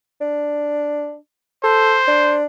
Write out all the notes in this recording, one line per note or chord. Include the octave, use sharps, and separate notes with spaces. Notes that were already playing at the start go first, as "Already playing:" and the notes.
D4
A4 C5
D4